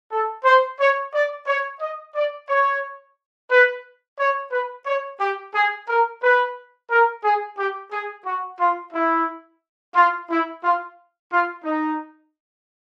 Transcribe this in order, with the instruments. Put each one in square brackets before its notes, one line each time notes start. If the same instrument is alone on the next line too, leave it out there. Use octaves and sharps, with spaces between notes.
[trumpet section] A4
C5
C#5
D5
C#5
D#5
D5
C#5
B4
C#5
B4
C#5
G4
G#4
A#4
B4
A#4
G#4
G4
G#4
F#4
F4
E4
F4
E4
F4
F4
D#4